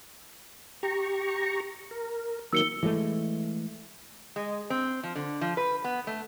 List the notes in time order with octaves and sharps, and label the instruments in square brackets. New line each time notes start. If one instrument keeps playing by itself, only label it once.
[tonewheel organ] G4 A#5 C#6
A#4
[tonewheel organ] D#3 F#3 A#3 [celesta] E6 C#7 G7
[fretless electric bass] E3 F3 G#3 A3
[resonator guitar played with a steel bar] G#3
C4
F3
D3
F3
B4
B3
A3